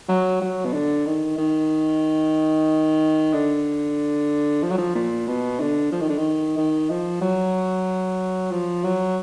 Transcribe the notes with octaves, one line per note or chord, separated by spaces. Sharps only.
F#3
F#3
B2
D3
D#3
D#3
D3
F3
F#3
F3
A#2
B2
D3
F3
D#3
D3
D#3
D#3
F3
F#3
F3
F#3